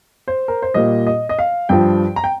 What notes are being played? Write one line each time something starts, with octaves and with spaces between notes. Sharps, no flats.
C5
A#4
C5
A#2 G3 D#5
D#5
D#5
F5
G2 F3 G5
A#5
G5